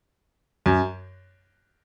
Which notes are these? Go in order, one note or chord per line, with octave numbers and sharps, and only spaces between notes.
F#2